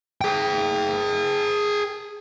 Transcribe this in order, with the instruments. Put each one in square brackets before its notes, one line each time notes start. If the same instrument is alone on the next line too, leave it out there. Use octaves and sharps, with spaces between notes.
[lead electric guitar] G#4 G5